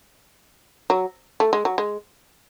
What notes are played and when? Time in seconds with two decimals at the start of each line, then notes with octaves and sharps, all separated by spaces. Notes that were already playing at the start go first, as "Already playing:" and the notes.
0.90 F#3
1.40 A3
1.53 G#3
1.65 F#3
1.78 G#3